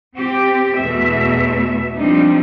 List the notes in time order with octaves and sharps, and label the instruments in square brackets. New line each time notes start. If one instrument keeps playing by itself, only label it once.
[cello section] C4 G4
E2 B2 A3 E5
F3 G3 C4 D4 D#4